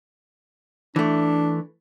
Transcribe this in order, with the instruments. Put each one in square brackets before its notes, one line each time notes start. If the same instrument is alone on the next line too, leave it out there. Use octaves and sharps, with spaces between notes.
[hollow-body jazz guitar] E3 A3 [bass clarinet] D4